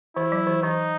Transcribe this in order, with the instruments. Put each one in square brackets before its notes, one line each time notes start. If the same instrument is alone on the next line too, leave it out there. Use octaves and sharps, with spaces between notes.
[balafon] E3 [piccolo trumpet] E4
[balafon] F#3
E3
[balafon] E3 [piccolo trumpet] D#4